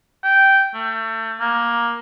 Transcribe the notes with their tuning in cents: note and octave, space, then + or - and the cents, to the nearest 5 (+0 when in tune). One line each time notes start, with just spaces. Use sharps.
G5 -10
A3 +30
A#3 +15